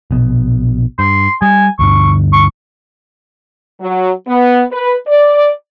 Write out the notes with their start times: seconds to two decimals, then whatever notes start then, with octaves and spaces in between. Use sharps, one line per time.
0.11 A#1 B2
0.99 G2 C6
1.42 G3 G#5
1.79 D2 G2 D3 C#6
2.33 C#6
3.81 F#3
4.28 B3
4.72 B4
5.08 D5